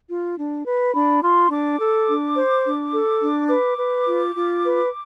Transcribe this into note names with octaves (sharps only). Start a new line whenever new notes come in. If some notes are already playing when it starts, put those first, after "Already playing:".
F4
D4
B4
D4 B5
F4 C6
D4 D6
A4
D4
C5
D4
A4
D4
B4 D6
B4
F4
F4
B4